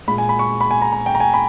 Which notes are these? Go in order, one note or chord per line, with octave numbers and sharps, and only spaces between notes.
A#2 G#3 B5
G#5
B5
C#6
B5
G#5
A#5
A#5
G5
A#5
G#5
B5